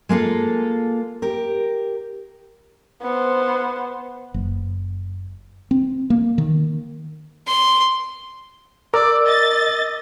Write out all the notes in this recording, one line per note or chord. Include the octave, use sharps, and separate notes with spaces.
G#3 A#3 F4 A4
G4 A#4
B3 C5
F#1
C4
A#3
D#3
C6
A#4 D5 D6 E6
D#5 A6